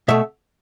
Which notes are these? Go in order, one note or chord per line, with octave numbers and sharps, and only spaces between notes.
B2 A3 E5